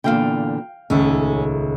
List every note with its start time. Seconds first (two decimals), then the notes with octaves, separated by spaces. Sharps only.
0.04 E2 A#2 D3 F5 G5
0.90 D#1 C#2 A3 C#4